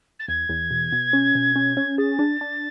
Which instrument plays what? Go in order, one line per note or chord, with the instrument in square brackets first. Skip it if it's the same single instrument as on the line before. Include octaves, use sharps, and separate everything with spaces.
[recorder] A6
[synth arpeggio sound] E2 [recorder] G#6
[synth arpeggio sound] E2
B2
B2
C#4
B2
C#4
C#4
[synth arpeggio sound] G#4 [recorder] A6
[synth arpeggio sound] D4
D4